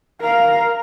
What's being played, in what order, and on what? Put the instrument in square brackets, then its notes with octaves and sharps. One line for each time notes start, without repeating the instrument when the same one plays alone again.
[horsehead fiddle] A#4 F5 [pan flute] A#5